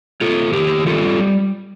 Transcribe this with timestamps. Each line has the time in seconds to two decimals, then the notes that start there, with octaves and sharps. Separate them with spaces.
0.21 C3 F4 A4
0.53 D#3 G4 A#4
0.86 G3 F4 A4